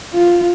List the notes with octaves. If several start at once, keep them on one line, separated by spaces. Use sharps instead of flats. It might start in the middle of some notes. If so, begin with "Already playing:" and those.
F4